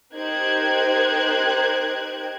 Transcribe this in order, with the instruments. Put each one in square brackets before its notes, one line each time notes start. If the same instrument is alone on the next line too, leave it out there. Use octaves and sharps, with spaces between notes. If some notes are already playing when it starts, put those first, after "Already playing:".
[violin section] D#4 G4 A#4 C5 F#6 G#6